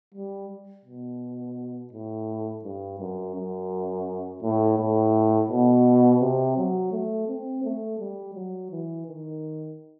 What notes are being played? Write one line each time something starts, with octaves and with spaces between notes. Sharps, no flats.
G3
B2
A2
G2
F#2
F#2
A2
A2
B2
C3
F#3
A3
C4
A3
G3
F#3
E3
D#3